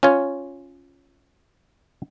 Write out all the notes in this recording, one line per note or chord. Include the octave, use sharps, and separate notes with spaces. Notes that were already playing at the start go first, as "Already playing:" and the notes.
C#4 F4 C#5